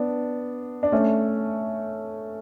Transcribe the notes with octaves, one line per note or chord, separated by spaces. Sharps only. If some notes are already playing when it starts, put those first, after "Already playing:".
Already playing: B3 D4
D4
A3 C#4